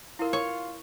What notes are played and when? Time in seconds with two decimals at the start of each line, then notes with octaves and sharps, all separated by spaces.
0.19 E4 F4 A#4
0.33 A#4 C#5